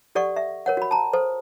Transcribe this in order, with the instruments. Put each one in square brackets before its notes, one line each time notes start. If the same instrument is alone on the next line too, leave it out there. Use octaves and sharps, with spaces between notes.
[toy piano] G4 A4 D5 F#5 C#6
E5
A#4 C#5 F#5
F#4 B5
A5 A#5
A4 C5